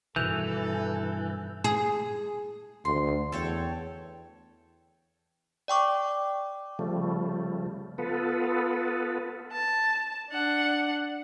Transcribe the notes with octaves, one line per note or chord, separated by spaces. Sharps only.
G2 B2 D#3 E3 A4 G6 F7
G#4
D2 C6
E2 A4 C#5 G5
D5 G5 C#6 D6
C#3 F3 G3 A3
B3 F4 A4 B4
A5
D4 F#5